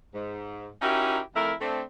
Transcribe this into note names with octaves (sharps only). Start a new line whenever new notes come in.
G#2
C#4 D#4 E4 F#4 G4 A#4
F2 A3 E4 A#4
A3 C4 D4